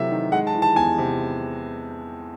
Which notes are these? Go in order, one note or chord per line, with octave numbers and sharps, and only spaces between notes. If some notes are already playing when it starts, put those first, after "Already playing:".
Already playing: C3 E3 F#3 A3 E5
D#3
G#3 F#5
A5
E3
A5
E2 G#5
C3